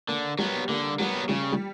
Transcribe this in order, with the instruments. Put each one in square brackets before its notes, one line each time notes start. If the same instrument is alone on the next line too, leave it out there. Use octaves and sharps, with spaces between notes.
[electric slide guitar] D3 [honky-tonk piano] A#3
[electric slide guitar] F#3 B3 [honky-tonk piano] G3
[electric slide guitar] D3 [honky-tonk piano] A#3
[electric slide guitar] F#3 B3 [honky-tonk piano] G3
[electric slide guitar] C#3 [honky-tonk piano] G3
[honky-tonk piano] G3